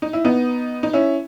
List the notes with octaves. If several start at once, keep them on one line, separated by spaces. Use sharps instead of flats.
D#4
E4
B3 D#4
D#4
C#4 E4